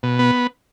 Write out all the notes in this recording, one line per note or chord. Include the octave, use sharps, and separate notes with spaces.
B2
B3